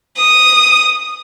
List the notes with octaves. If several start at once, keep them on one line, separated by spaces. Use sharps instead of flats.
D#6